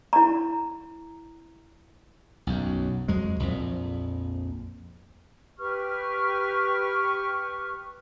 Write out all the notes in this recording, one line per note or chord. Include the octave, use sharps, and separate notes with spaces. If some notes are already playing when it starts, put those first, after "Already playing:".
E4 A#5
B1 F#2
F2 F#3 G#3
A#1 F2
G4 B4 C#6 F6